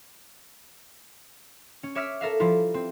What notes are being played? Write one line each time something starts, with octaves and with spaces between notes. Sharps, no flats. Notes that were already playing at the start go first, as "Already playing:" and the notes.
C#4
C#5 E5 D6 E6 F6 B6
A4 A#4 E5 F5
F3 G3 E4 F4
C4